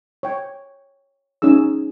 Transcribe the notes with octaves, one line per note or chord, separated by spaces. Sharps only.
C#5 G5
C#4 D#4 G#4 E6